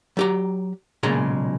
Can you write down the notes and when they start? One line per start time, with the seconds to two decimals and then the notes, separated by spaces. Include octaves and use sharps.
0.17 F#3 G4 A#5
1.03 B1 A#2 C#3 G#3 A#5